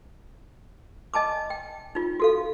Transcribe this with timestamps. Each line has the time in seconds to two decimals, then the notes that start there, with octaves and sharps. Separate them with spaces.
1.14 D#5 G#5 A5 D6
1.50 G5
1.95 D#4 F4
2.20 F#4 A4 F5